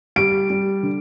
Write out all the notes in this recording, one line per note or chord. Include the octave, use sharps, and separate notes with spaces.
G3 D7
G3
D3